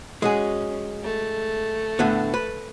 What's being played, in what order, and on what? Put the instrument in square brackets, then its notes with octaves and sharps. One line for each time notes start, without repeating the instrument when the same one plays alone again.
[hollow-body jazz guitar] G#3 F#4 G#4 [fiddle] C#4
[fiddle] A3
[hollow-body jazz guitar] A2 D3 B3
B4